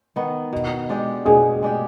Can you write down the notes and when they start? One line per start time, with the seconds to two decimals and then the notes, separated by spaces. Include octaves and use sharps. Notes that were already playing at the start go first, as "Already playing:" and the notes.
0.16 D#3 B3
0.53 B2
0.89 G#3 D4 G4
1.25 B2 G#4
1.62 G#3 D4 G4